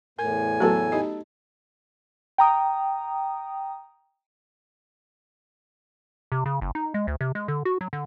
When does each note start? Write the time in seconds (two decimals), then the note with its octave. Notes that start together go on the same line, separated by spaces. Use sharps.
0.19 E2 A2 A#4 G#5
0.60 F#3 A3 B3 A4 A5
0.92 D#4 G4 D#5
2.38 G5 A#5 D#6
6.32 C3
6.46 C#3
6.61 F#1
6.75 D#4
6.94 G#3
7.07 D2
7.21 C3
7.35 G#3
7.48 D3
7.65 F#4
7.81 F#3
7.93 D3